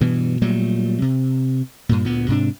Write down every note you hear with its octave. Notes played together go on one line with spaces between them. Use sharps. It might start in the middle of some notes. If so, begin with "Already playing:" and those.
G2 B2 E3
A#2 F#3 G3 A3
C3
G2 A#2
D2 A#2 B3
G#2 C3 D4